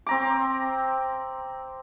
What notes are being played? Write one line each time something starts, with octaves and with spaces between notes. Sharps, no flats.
C4 A#5 D6